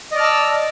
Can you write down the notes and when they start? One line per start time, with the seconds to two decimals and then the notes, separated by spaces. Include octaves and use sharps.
0.12 D#5
0.15 D5
0.17 F6
0.20 A5
0.23 E6